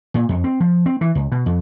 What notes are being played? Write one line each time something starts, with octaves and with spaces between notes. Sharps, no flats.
A#2
F2
C4
F3
C4
E3
C#2
B2
F2